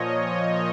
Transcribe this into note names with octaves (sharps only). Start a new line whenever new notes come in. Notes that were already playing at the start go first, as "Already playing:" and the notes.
Already playing: A#2 F3 C#5 D#5